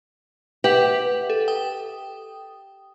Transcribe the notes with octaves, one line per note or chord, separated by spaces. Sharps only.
G4 B4 E5 F#5
A4
G5 D#6